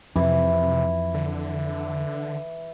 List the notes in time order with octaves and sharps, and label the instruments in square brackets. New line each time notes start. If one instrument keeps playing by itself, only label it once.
[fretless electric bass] F2 [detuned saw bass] C3 [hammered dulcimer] E3
[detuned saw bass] D3